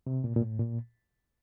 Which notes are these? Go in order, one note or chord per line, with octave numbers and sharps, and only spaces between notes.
C3
A#2
A#2
A2
A#2